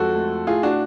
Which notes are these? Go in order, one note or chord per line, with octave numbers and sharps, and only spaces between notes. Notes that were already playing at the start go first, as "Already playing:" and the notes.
Already playing: F2 G#3 F#4 A4
A3
A2 F4 G#4
D4 F#4